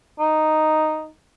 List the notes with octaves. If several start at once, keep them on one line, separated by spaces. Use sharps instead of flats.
D#4